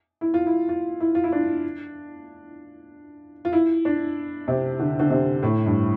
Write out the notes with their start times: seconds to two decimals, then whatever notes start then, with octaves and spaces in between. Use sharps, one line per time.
0.21 E4
0.34 F4
0.46 E4
0.69 F4
1.00 E4
1.15 F4
1.24 E4
1.32 D4
3.45 F4
3.53 E4
3.85 D4
4.48 C3
4.79 D3
5.00 D3
5.10 C3
5.43 A2
5.66 G2